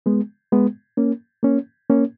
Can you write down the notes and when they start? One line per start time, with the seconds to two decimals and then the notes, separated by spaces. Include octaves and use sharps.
0.06 G#3 B3
0.52 G#3 B3
0.97 A#3 C#4
1.43 A#3 C#4
1.90 A#3 C#4